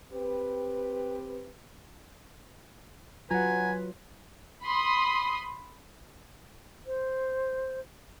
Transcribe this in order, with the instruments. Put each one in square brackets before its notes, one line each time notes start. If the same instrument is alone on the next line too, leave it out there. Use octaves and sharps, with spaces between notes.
[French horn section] C4 G4 B4
[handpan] F#3 F4 [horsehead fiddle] B4 [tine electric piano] F#5 A#5 [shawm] G#5
[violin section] B5 C6 D#6
[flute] C5